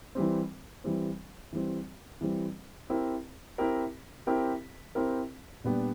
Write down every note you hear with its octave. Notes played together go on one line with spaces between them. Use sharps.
E3 G3 C4
E3 G3 C4
E3 G3 C4
E3 G3 C4
C4 E4 G4 A#4
C4 E4 G4 A#4
C4 E4 G4 A#4
C4 E4 G4 A#4
A#2 G3 B3 D4 G4